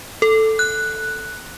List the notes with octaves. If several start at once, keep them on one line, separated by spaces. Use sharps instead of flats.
A4
F#6